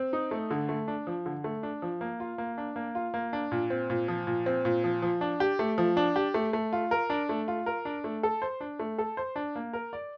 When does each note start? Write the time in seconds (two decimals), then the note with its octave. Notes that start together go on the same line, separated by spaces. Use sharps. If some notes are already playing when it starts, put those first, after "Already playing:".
Already playing: C4
0.13 D#4
0.31 A3
0.51 D3
0.69 A3
0.88 D4
1.07 F3
1.26 D3
1.44 A3
1.63 D4
1.82 F3
2.01 A#3
2.20 F4
2.38 A#3
2.58 D4
2.76 A#3
2.95 F4
3.14 A#3
3.33 D4
3.52 A#2
3.70 C4
3.90 A#2
4.08 F3
4.27 A#2
4.46 C4
4.65 A#2
4.84 F3
5.02 F3
5.21 D4
5.40 G4
5.59 A3
5.78 F3
5.97 D4
6.16 G4
6.34 A3
6.53 A3
6.73 F4
6.91 A#4
7.10 D4
7.29 A3
7.48 F4
7.66 A#4
7.85 D4
8.04 A3
8.23 A4
8.42 C5
8.61 D4
8.79 A3
8.98 A4
9.17 C5
9.36 D4
9.56 A#3
9.73 A#4
9.93 D5